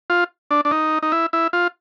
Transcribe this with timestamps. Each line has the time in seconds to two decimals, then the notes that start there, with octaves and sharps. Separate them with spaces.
0.10 F4
0.51 D4
0.65 D4
0.71 D#4
1.03 D#4
1.12 E4
1.33 E4
1.53 F4